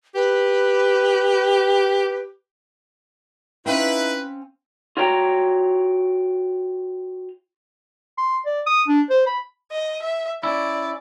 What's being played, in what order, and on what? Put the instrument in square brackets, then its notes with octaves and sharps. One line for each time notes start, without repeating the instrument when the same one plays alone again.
[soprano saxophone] G4 [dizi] B4
[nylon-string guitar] C4 C#4 F5 [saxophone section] D#4 E4 [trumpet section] B4
[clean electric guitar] F4 F#4 C#5 G5 A#5
[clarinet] C6
D5
D#6
D4
C5
B5
[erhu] D#5
E5
[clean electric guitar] C#4 E4 [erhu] D5